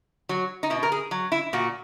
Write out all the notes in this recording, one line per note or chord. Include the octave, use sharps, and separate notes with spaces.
F#3
D#4
B2 E4
A#4
G#4
F#3
E4
A#2 F#4